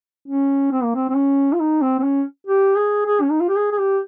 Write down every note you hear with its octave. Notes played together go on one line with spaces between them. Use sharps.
C#4
C4
A#3
C4
C4
C#4
F4
D#4
C4
C4
C#4
G4
G#4
G#4
C#4
D#4
F4
G4
G#4
G#4
G4